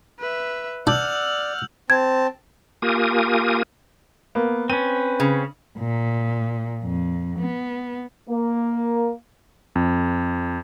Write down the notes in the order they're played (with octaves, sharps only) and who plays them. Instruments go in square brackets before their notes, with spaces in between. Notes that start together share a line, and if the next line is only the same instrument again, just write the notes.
[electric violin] B4 E5
[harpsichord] D4 [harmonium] D5 [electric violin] F#5 F6 [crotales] E6 G6 F#7
[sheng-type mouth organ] C4 A5 [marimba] G#6
[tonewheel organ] A#3 F4 G4 A#4 G#5 D#6
[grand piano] A#3 B3
[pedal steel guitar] C4 C#4 [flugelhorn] B4 [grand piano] D#7
[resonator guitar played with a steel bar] C#3
[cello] A#2
F2
B3
[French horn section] A#3
[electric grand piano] F2